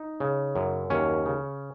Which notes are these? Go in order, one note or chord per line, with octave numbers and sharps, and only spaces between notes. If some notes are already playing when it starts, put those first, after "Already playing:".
Already playing: D#4
C#3
F#2
D#2 C#4
C#3